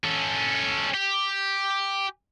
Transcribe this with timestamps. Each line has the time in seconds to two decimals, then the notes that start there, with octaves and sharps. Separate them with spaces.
0.04 C#4 A4
0.94 G4